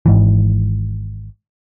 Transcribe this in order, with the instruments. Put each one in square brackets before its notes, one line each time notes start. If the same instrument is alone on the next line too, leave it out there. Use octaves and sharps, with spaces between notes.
[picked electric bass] G#1 G#2 E3